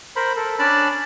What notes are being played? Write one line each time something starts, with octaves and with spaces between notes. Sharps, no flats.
A#4 C5 B5
A4 A#4
C#4 D4 D5 A5 B5